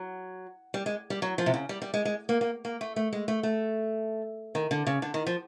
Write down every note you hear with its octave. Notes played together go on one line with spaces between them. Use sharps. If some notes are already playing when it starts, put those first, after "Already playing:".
Already playing: F#3
G3
G#3
G3
F#3
F3
C3
C#3
G3
G3
G#3
G#3
A#3
A#3
A#3
A3
A3
G#3
A3
A3
D#3
D3
C#3
D3
D#3
F3